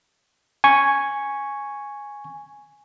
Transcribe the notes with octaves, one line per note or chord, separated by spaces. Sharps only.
G#5 C#6